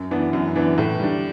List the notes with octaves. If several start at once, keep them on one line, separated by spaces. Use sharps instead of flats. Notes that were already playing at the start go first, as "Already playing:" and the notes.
Already playing: F#2
E3 B3 D4
F#2
E3 B3 D4
A2
G3 D4